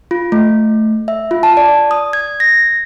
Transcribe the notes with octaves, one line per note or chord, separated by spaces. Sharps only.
F4
A3
E5
F4
A5
D5
D#6
G#6
A#6